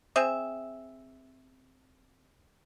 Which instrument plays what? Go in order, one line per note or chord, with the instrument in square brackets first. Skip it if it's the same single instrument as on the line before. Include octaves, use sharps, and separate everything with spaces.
[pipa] C4 G#4 E5